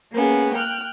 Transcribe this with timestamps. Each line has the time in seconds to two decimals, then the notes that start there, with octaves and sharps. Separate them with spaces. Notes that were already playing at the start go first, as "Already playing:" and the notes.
0.13 A#3 B3 C#4 G#4
0.54 G5 F6 F#6